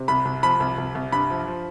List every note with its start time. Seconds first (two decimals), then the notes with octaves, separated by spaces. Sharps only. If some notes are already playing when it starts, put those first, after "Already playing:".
Already playing: C3
0.08 C2 B5
0.25 C2
0.43 F3 B5
0.60 C2
0.78 C2
0.95 C2
1.12 G2 B5
1.30 F3
1.47 F3